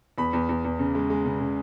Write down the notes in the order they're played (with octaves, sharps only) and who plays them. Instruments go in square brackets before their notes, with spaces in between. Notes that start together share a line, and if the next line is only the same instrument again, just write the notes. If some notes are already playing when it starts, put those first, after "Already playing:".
[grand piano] E2 B5
E2
E2
E2
C#3
G#3
G#3
C#3
C#3